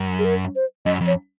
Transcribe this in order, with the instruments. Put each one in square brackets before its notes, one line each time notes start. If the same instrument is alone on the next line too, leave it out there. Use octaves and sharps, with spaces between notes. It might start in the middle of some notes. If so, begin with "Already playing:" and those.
Already playing: [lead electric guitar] F#2
[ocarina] G#4
A#4
C5
[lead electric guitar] F#2 [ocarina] D#5
[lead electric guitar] F2
[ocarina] C#5